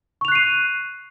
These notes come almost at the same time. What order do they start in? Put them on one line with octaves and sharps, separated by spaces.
C#6 F7 F#6 C7 D#7